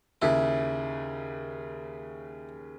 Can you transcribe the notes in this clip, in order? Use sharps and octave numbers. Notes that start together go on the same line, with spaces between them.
D#2 C#3 E4